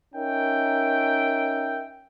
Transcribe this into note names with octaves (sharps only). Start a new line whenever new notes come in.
C#4 D#4 A#4 E5 G5